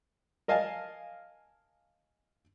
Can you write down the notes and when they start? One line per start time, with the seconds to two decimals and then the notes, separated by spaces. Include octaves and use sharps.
0.48 A#4 D#5 F5 G#5 A5